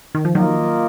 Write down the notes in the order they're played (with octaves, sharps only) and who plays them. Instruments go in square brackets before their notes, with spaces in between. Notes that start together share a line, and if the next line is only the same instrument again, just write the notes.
[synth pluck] D#3
F3
[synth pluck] D#3 F#3 [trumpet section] A#3 F4 A#4 D#5